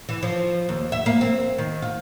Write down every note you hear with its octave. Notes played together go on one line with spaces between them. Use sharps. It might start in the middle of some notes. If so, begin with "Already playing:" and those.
E3
F3
D#2
E5
A#3
C4
D#3
F4